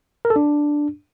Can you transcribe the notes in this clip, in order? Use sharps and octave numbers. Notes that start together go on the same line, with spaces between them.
A#4
A4
D4